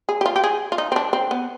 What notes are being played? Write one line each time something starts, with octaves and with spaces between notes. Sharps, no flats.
G#4
G4
F4
G4
G#4
F4
D#4
C4
D4
C4
B3